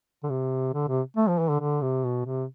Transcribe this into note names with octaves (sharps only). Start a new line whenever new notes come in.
D3
C3
D3
C3
A3
F3
E3
D3
D3
C3
B2
C3